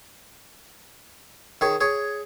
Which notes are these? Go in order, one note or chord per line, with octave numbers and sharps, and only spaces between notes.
D#3 G#4 C#5
G#4 C#5